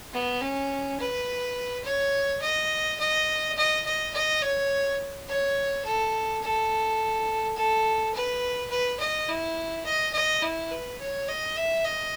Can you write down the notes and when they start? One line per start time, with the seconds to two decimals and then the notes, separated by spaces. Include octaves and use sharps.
0.13 B3
0.42 C#4
1.00 B4
1.84 C#5
2.42 D#5
2.99 D#5
3.57 D#5
3.85 D#5
4.14 D#5
4.42 C#5
5.28 C#5
5.84 A4
6.42 A4
7.56 A4
8.14 B4
8.70 B4
9.00 D#5
9.28 E4
9.85 D#5
10.13 D#5
10.42 E4
10.70 B4
11.00 C#5
11.28 D#5
11.56 E5
11.85 D#5